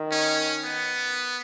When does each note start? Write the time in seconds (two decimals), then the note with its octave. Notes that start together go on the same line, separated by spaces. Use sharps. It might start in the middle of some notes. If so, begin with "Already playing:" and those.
Already playing: D#3
0.11 C#4
0.64 B3